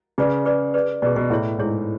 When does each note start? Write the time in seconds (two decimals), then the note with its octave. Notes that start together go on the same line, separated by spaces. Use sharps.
0.18 C#3 G#4 B4 D5
0.46 G#4 B4 D5
0.74 G#4 B4 D5
1.02 B2 G#4 B4 D5
1.16 B2
1.30 A2 E4 G#4 C#5
1.58 G#2 E4 G#4 C#5